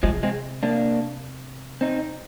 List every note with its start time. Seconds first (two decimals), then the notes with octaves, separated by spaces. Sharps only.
0.03 C3 F3 G#3
0.23 G#3 C4
0.63 A#3 D4
1.81 C4 D#4